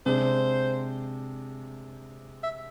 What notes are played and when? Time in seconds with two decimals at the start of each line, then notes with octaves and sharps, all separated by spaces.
0.06 C3 G#3 D4 C5
2.43 E5